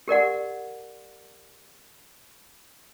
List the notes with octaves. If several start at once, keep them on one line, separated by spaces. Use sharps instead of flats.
G4 A#4 D5 F#5